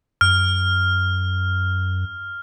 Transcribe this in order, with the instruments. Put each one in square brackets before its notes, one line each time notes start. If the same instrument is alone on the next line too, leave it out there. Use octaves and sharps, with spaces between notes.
[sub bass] F#2 [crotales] F6